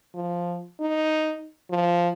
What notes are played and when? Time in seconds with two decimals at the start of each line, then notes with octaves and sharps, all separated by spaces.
0.14 F3
0.80 D#4
1.70 F3